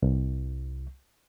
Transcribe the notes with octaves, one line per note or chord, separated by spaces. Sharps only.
C2